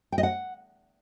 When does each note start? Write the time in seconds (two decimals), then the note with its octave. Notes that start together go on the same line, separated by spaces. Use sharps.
0.12 G5
0.18 D#5
0.23 F#5